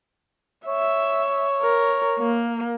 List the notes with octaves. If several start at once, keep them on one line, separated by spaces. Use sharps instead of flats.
C#5 E5
A#4
A#3